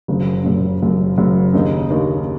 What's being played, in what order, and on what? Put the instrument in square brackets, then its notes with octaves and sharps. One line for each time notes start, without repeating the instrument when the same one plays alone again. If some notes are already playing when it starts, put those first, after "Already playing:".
[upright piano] F#1 F#2 C#3
F#1 F#2 C#3
F#1 F#2 C#3
F#1 F#2 C#3
D#2 C#3 A#3 D#4
D#2 C#3 A#3 D#4